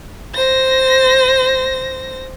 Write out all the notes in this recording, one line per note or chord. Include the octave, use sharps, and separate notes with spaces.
C5 A#6